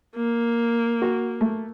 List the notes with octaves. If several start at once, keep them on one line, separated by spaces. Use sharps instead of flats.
A#3
F#4
A3